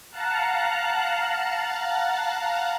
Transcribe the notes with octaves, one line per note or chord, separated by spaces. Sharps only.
F5 F#5 A5 A#5 F#6